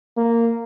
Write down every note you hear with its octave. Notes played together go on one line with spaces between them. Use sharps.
A#3